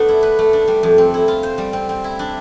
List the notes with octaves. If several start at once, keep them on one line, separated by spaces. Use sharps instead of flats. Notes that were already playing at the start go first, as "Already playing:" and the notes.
Already playing: A3 B3 D4
E4
B4
A3
D4
G3
F2
C4
E4
F4
C5
G3
C4
C4
E4
D4